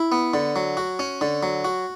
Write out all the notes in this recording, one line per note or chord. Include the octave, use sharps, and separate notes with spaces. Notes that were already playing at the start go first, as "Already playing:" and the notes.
Already playing: E4
B3
D3
F#3
F#4
C#4
D3
F#3
F#4